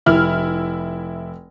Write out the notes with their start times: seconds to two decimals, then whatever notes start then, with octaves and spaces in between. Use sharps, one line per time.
0.06 F1 E4 F6